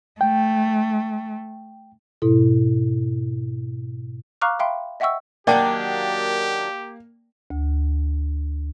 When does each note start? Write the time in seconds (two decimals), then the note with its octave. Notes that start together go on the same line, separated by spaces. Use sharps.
0.21 A3 G5
2.22 G#2 B2 E4 A4
4.41 F5 A#5 C#6 D6 F6 F#6
4.59 E5 F5 G5 B5 C6
5.00 D#5 E5 F#5 G5 C#6 E6
5.47 D#3 F#3 A#3 D4 G4 D5 G5 A5
7.50 D2